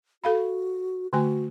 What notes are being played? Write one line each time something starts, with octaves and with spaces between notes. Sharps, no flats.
F#4 A4 F5 B5
D3 A3 F#4 G#5